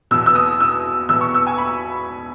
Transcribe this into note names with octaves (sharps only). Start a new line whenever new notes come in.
E2 B2 E6
E6
D#6
E6
E2 B2 E6
C#6
E6
G#5
B5